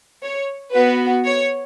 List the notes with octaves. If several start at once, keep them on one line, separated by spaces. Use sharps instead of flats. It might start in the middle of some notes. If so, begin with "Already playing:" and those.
C#5
B3 F#4 B4
C#5